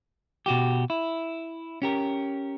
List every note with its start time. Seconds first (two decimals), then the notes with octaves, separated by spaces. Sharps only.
0.46 B2 F#4 G4
0.90 E4
1.82 C#4 G4 A#4